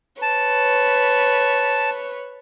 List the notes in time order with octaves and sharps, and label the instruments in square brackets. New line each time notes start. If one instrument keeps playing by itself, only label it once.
[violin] B4 C#5 [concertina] A5